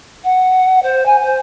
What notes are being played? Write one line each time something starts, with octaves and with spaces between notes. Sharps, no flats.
F#5
C5
G#5
C5